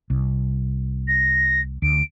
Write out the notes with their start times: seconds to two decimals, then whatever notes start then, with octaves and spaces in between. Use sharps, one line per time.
0.10 C2
1.07 A#6
1.82 D2 D7